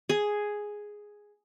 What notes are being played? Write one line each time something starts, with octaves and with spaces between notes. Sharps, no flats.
G#4